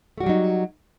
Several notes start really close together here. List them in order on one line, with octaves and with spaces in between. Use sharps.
A3 F#4 G3 F#3 D#4